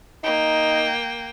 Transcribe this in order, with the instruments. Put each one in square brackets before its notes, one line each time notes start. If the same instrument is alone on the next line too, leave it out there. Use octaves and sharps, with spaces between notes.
[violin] A#3 G5 [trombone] D#4